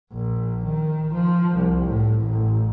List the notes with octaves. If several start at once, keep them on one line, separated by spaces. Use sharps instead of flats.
A#1
D#3
F3
C2
A2
A1